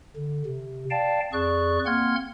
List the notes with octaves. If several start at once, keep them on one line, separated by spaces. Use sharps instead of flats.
D3
C3
D5 F5 G5 A5
F2 G#4 D5 C#6 F#6
A#3 C4 F#5 C6 F6 G#6